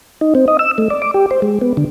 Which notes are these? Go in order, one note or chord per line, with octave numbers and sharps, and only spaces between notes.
D#4
C4
D#5
E6
A3
D5
D6
G4
C5
G#3
B3
D3